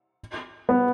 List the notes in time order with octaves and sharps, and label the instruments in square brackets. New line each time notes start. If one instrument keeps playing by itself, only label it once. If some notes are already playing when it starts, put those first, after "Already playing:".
[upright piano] B3